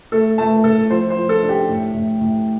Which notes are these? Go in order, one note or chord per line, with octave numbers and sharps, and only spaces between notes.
A3 A4
A3 A5
A2 A4
F3 C5
C5
F3
A4
D4
G4
A2
A2
A2